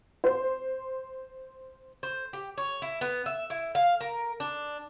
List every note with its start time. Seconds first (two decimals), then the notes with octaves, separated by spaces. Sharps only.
0.24 C5 C6
2.03 C5
2.33 G4
2.58 C#5
2.82 E4
3.01 B3
3.26 E5
3.50 E4
3.75 F5
4.01 A#4
4.40 D4